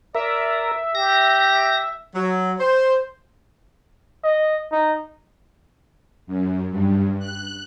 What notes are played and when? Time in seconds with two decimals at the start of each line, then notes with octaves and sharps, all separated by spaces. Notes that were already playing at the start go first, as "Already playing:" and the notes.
0.15 A#4 D5 E5
0.95 G4 A#6
2.14 F#3
2.59 C5
4.24 D#5
4.72 D#4
6.27 F#2
6.71 G2
7.19 F#6